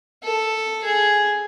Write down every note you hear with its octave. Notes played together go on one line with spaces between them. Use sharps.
A4
G#4